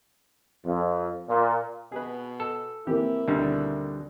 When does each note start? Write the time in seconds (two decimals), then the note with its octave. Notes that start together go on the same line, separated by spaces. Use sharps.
0.65 F2
1.29 A#2
1.92 B2 G#4 B4
2.40 A4
2.87 E3 A#3 C4 E4 G4
3.28 D2 B2 D3 D#3 G3